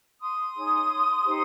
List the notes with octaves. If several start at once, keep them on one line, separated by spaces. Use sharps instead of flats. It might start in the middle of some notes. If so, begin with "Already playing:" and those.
C6 D#6
D#4 G#4 C#5
D#4 G4 C5